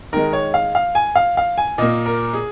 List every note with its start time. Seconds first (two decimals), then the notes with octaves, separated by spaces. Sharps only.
0.13 D#3 G#3 A#4
0.33 C#5
0.54 F5
0.75 F5
0.95 G#5
1.16 F5
1.37 F5
1.58 G#5
1.78 A#2 A#3 D#5
2.06 A#4
2.33 G#4